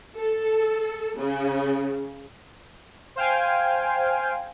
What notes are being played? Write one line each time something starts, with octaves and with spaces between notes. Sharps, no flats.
A4
C#3
C5 F5 G5 G#5